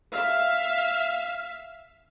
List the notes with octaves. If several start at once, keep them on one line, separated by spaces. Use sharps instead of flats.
E5 F5